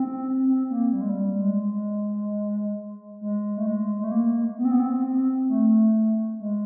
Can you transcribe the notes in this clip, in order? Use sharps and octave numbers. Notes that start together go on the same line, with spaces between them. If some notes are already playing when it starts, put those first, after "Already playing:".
Already playing: C4
C4
A#3
G3
G#3
G3
G#3
G#3
A3
G#3
G#3
A3
A#3
B3
C4
B3
C4
A3
G#3